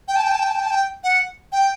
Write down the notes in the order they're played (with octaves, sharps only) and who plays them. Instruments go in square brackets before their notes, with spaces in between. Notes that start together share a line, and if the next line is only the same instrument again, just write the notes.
[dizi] G5
A5
G5
A5
G5
A5
G5
A5
G5
F#5
G5